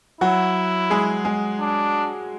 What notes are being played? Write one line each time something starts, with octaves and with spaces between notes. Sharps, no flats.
F#3 E4 F#4
G#3 G#4
G#3 G#4
D4